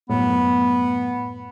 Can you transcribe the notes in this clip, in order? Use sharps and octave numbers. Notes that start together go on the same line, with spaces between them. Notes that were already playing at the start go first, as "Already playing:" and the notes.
F#2 A2 B3